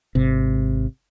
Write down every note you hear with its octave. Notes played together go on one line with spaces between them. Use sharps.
G#1 C3